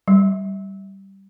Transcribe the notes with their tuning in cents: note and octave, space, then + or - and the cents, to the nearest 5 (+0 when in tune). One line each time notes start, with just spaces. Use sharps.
G3 -10